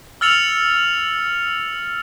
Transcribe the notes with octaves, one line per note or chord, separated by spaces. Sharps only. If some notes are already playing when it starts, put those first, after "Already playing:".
E6 F6 A6 C#7 F7 F#7